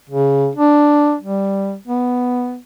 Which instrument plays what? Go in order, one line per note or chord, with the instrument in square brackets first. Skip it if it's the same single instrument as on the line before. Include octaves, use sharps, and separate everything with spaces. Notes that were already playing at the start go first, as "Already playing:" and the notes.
[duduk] C#3
D4
G3
B3